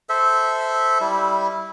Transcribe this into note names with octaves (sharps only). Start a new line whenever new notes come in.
A4 C5 E5
G3 E4